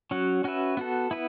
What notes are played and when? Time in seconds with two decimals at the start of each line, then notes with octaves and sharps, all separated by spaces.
0.11 F#3 C#4 F#4 C#5
0.44 C#4 F#4 B4 E5
0.77 B3 F#4 A4
1.11 B3 E4 B4